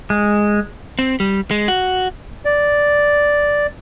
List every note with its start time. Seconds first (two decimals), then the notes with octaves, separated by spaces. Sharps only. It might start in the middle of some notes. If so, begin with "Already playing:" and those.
0.10 G#3
0.99 C4
1.20 G3
1.51 G#3
1.68 F#4
2.45 D5